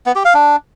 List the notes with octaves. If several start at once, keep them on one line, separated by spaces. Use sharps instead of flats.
B3
G4
F5
D4